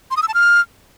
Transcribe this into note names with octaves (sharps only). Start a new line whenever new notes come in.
C6
D#6
E6
A5
F6